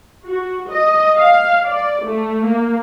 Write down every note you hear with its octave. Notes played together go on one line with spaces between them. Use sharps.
F#4
D#5
F5
D5
A3
A#3